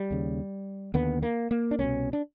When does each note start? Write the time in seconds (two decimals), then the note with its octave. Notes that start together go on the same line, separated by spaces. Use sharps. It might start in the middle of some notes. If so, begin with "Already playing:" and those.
Already playing: G3
0.11 D#2 C#3
0.94 D#2 D3 B3
1.22 A#3
1.51 A#3
1.71 D4
1.79 C2 B2 C#4
2.13 D4